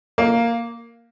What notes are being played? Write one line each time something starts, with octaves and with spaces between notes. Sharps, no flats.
A#3